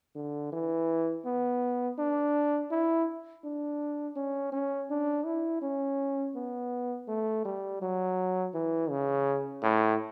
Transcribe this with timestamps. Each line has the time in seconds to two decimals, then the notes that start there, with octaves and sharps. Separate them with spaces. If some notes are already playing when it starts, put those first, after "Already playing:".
0.15 D3
0.52 E3
1.25 B3
1.98 D4
2.71 E4
3.44 D4
4.16 C#4
4.52 C#4
4.90 D4
5.25 E4
5.62 C#4
6.35 B3
7.08 A3
7.45 G3
7.81 F#3
8.54 E3
8.90 C#3
9.62 A2